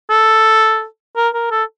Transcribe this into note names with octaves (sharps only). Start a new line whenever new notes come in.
A4
A#4
A#4
A4